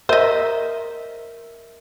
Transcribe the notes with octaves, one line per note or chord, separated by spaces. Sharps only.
A#4 C5 D#5 E5